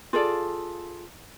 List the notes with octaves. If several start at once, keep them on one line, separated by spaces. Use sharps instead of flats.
F4 G#4 A4 D5